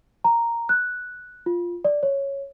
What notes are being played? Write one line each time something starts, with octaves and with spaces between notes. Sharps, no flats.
A#5
F#6
F4
D5
C#5